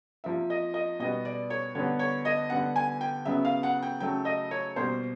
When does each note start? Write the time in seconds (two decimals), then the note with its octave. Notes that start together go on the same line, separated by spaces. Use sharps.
0.24 C3 F3 A#3 E5
0.50 D#5
0.74 D#5
0.99 B2 G3 B3 D#5
1.25 D5
1.50 C#5
1.75 D3 G3 B3 C#5
1.99 C#5
2.25 D#5
2.50 D3 G3 B3 F#5
2.76 G#5
3.01 G5
3.25 C#3 F#3 B3 E5
3.45 F5
3.63 F#5
3.82 G5
4.00 C#3 F#3 A3 G5
4.25 D#5
4.51 C#5
4.76 B2 G3 A#3 C5